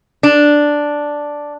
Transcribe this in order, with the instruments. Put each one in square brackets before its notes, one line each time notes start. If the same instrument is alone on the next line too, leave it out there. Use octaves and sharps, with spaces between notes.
[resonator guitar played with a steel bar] D4